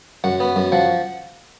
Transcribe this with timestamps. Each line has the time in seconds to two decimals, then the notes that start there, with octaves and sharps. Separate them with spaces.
0.24 F#2 F#5
0.40 B3
0.56 F#2
0.72 F3 F#5